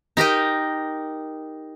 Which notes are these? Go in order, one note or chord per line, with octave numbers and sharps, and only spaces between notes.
D#4 G4 A#4 D#5